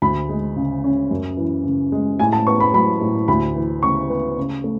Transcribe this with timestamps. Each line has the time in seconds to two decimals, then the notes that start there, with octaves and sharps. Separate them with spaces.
0.02 D2 B5
0.29 G#3
0.56 C#3
0.84 C#4
1.11 F#2
1.37 E3
1.65 C#3
1.92 G#3
2.19 A2 G#5
2.33 A5
2.47 B3 C#6
2.60 B5
2.74 F#3 B5
3.01 A2
3.28 D2 B5
3.55 E3
3.82 C#3 C#6
4.10 B3
4.38 C#3
4.64 A3